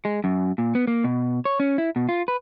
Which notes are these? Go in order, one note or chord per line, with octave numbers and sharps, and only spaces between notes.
G#3
F#2
A#2
B3
A#3
B2
C#5
C#4
E4
B2
F4
B4